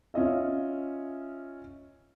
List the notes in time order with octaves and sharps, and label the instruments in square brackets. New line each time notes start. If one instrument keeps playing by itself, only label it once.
[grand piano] C#4 F4 D#5 E5